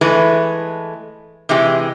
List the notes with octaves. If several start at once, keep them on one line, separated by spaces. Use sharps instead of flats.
E3 G#3 A3 B4
C3 E3 G#3 G4